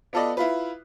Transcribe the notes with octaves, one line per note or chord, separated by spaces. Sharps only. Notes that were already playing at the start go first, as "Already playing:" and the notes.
B3 F4 A4 B4 D5 D#5
E4 F4 B4